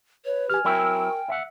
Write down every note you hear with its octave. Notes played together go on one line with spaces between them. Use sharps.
B4 C#5
G4 G#5 F6
F#3 C4 E4 A#4 G5
E4 E5 F#5